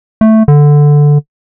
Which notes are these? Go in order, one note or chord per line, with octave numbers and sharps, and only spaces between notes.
A3
D3